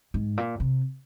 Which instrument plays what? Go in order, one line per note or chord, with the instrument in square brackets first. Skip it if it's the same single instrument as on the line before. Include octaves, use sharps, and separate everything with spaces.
[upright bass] G#2
A#2
C3